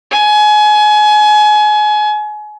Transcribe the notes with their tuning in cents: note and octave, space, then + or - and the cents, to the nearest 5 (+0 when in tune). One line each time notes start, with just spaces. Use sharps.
G#5 +30